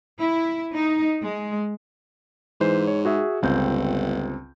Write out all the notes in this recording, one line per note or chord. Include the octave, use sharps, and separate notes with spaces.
E4
D#4
G#3
G#2 E3 B4 C5
C#5
F#4 G#4 E5
G1 C#2 C4 G6